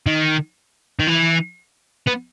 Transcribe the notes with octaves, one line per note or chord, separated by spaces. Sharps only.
D#3
D#3
E3
B3